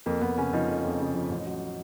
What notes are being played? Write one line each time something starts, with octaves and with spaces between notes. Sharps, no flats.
F2 A#3
F2 B3
C#3 C#4
F3 D#4
F2
F2
C#3
F3
A1
F#3